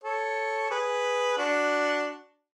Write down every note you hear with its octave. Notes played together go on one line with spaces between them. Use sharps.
A4 C#5
G#4 B4
D4 F#4